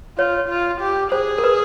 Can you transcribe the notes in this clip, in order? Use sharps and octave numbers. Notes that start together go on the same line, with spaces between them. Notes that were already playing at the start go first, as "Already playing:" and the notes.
F4 C#5
F4
G4
G#4 C5
A#4
B4